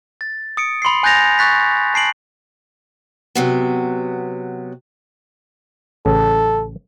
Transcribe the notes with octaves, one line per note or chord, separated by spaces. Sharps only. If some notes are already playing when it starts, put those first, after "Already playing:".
A6
D#6 C#7 D7
B5 C6 D#6 C7
G#5 F#6 G6 A6 A#6 F7
C#6 F#6 A6 B6
A5 C7 D7 F#7
C3 F#3 B3
A1 C#3 A4